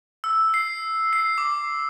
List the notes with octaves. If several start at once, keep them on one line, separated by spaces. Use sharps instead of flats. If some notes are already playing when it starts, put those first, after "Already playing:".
E6
C7
C7
D6